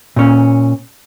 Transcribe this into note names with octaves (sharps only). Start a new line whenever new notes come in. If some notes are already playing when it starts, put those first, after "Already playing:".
A#2 C#4